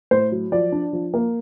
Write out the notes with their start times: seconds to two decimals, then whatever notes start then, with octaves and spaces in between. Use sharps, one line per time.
0.11 A2 C5
0.32 F#3
0.52 F3 D5
0.72 D4
0.93 F3
1.14 A#3